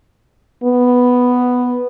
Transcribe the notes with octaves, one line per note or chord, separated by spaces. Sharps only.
B3